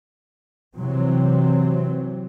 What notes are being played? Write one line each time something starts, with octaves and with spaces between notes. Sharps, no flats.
C3 E3 F#3 C4